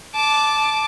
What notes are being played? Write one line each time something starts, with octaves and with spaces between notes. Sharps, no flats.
A5 D6